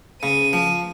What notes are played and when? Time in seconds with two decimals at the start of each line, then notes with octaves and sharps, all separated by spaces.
0.22 C#3 D#7
0.53 F3